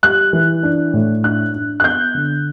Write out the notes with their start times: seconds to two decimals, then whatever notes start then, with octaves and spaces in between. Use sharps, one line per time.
0.03 G3 F#6
0.33 E3
0.63 D4
0.94 A2
1.24 D4 F#6
1.53 D4
1.80 F#6
1.84 B3 G6
2.14 D3